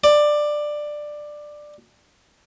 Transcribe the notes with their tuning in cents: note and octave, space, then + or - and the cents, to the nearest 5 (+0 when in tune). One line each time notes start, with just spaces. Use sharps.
D5 +15